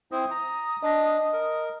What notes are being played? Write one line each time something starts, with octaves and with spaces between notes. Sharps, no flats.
C4 E4 C5 D#6
A#5
D4 D#5 A#6
A#4